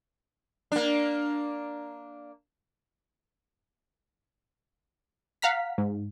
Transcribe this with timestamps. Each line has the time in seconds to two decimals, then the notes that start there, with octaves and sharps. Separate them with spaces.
0.72 A#3 D4
5.42 F5 F#5 A#5 F6 B6
5.78 G#2